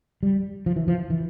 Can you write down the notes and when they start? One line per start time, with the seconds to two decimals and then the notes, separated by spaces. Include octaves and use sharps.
0.23 G3
0.66 F3
0.76 E3
0.88 F3
1.10 E3